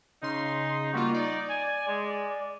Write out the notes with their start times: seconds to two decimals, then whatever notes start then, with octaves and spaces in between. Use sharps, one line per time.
0.22 C#3 D#4 C6
0.93 G3 A#3 F4 F#4
1.14 D#4 D5
1.50 G#5
1.88 G#3